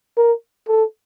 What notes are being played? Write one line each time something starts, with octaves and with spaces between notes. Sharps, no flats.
A#4
A4